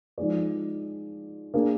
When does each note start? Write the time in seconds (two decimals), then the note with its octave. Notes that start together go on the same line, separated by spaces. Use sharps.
0.18 F3 G#3 D#4 G#4 D5
1.54 A#3 D4 G#4